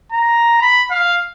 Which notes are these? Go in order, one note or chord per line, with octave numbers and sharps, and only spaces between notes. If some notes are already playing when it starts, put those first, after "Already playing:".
A#5
B5
F5